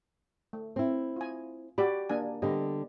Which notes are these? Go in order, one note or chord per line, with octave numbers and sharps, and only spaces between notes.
A3
C4 E4
F4 G#5
F#4 G4 D5 B5
A#3 D4 G#5
D3 G3 B3 D#5